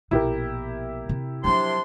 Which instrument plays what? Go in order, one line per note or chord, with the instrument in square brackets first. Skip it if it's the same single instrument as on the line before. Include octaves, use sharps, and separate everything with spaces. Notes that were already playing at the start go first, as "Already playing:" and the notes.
[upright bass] A#1 B2 [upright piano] E4 G4 A#4
[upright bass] C3
[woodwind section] C3 D4 C6 [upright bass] F3 F#3